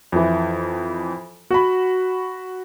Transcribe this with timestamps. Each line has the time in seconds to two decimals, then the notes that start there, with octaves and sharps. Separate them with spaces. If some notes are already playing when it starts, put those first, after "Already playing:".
0.12 F2 E3
1.51 F#4 B5